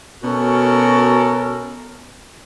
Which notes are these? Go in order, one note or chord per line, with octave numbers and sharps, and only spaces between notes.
B2 C#4 F#4 A4 A#4